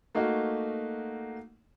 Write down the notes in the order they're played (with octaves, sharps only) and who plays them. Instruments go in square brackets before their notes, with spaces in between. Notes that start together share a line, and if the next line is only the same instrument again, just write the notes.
[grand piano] A3 A#3 D#4 F#4